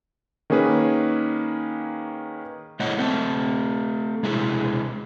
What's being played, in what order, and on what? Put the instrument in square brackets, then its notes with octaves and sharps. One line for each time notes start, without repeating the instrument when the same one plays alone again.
[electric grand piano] D#3 A#3 C#4 G#4 B4
[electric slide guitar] G#3 A#3 E4 C#5 D#5 F#5
A3 C4 G5 A5
C3 G#3 E4 G#4